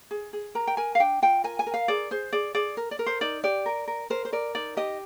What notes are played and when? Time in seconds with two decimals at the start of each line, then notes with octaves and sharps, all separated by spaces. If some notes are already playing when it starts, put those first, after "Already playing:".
0.11 G#4
0.33 G#4
0.55 A#4 A#5
0.67 G5
0.77 A#4 G#5
0.95 F5
1.00 D4 G5
1.22 F4 G5
1.44 A#4 G#5
1.59 G#5
1.67 A#4
1.74 F5
1.88 G#4 D5
2.11 G#4 C5
2.33 G#4 D5
2.55 G#4 D5
2.77 A#4
2.91 D5
2.99 A#4
3.06 C5
3.21 D#4 D5
3.43 G4 D5
3.66 A#4
3.88 A#4
4.10 A#4 C5
4.25 C5
4.33 A#4 D5
4.55 D#4 D5
4.77 G4 D#5